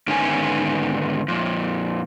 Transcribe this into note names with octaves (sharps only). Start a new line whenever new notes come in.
G#2 D3 D#3 B3 C#4 G#5
F2 A#2